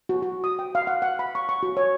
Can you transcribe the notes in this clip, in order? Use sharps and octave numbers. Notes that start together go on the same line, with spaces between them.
F#4
F#4
D#6
G5
F5
F#5
F#5
B5
C#6
C#6
F#4
C#5